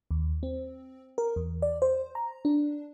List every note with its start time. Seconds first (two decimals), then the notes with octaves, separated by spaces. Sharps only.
0.11 D#2
0.43 C4
1.18 A#4
1.36 E2
1.62 D5
1.82 C5
2.15 A#5
2.45 D4